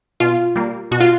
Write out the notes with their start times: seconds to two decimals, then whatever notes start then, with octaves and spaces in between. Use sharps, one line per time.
0.20 B2 F4
0.56 G3 A#3
0.91 B2 F#4
1.00 F4